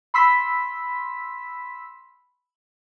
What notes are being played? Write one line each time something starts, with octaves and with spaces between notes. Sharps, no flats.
B5 C6 E6 B6